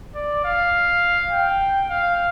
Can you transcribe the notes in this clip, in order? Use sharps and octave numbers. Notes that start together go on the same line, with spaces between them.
D5
F5
G5
F5